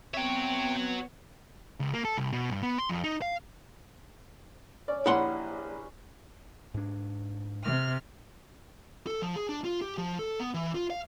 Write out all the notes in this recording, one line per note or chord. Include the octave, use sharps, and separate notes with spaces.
B3 C4 F#4 C#5 E5 G5
C#2
A#3
A4
C2
B2
G2
B3
C6
F2
D#4
F5
C#4 D5
A#1 A#2 G3 E4 B4 F#5 C6
G#2 D4
C3 F6
A4
F3
G#4
D4
F4
G4
F3
A4
B3
E3
F4
F5